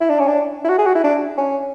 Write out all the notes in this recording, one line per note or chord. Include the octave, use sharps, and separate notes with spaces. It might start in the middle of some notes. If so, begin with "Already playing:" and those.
E4
D4
C#4
D4
E4
F#4
G#4
F#4
E4
D4
C#4